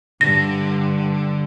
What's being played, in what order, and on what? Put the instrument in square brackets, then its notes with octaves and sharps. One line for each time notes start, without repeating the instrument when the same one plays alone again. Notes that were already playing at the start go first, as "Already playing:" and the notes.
[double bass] G2 [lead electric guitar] D3 [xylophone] A#6